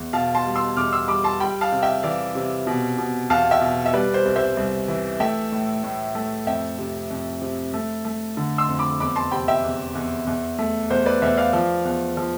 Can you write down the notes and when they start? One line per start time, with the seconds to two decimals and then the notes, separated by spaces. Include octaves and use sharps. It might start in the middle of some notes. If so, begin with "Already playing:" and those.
Already playing: E2
0.13 B2 F5 A5
0.35 A5 C6
0.46 G3
0.56 C6 E6
0.77 E2 D6 F6
0.92 C6 E6
1.08 G3 B5 D6
1.24 A5 C6
1.40 G3 G5 B5
1.61 F5 A5
1.72 C3
1.82 E5 G5
2.03 E3 D5 F5
2.35 C3
2.67 B2
2.98 B2
3.30 E2 F5 A5
3.51 E5 G5
3.61 B2
3.86 E5
3.93 G3 B4 D5
4.14 C5
4.25 C2
4.36 C5 E5
4.57 C2
4.88 E3
5.20 A3 E5 G5
5.52 A2
5.84 A2
6.15 A3
6.47 F2 E5 G5
6.79 C3
7.10 F2
7.42 C3
7.74 A3
8.05 A3
8.37 D3
8.58 C6 E6
8.69 F2
8.79 B5 D6
9.00 E2 B5 D6
9.16 A5 C6
9.31 C3 G5 B5
9.48 E5 G5
9.64 E2
9.95 E2
10.27 E2
10.59 A3
10.90 E2 C5
11.06 B4 D5
11.22 E2 C5 E5
11.37 D5 F5
11.53 F3
11.85 E2
12.17 F3